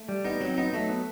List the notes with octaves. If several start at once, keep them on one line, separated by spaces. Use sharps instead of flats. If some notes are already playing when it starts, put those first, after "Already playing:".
Already playing: A3
G3
B3 D#4
F#3 C4
B3 D#4
F#3 A3
B3